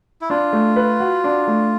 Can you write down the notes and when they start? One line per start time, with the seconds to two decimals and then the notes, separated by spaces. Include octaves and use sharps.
0.21 E4
0.30 D4 F4
0.53 A3
0.76 B4
1.00 F#4
1.24 D4
1.47 A3